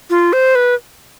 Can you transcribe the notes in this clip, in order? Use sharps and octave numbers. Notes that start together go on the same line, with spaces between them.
F4
C5
B4